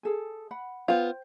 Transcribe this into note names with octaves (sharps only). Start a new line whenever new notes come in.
G#4 A4 G#5
F#5 B5
B3 F4 C5 G5